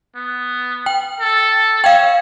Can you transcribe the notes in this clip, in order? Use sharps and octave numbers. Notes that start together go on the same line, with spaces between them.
B3
G5
A4
C#5 F5 G5